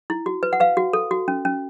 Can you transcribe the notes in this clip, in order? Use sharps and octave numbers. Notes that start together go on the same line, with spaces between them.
E4
F#4
B4
F#5
B4 F5
F#4
A4
F#4
C#4
C#4